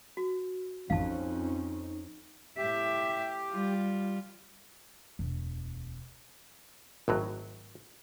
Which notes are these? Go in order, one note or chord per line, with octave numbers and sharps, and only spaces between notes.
F#4
A1 F2 C#4 D#4 F5 A5
A2 G4 E5
G3 F4
E1 D2
G#1 A2 F#3